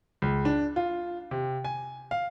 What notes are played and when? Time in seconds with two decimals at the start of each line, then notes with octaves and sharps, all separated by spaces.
0.22 C#2
0.45 D4
0.76 F4
1.31 C3
1.64 G#5
2.11 F5